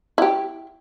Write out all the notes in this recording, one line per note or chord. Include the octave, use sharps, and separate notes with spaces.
E4 G4